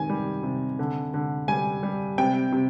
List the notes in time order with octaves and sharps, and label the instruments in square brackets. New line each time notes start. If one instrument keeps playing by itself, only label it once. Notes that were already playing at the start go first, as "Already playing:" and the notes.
Already playing: [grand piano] C3 D#3 G#5
G3
C3
D3
D3
G3 G#5
G3
C3 G5
C3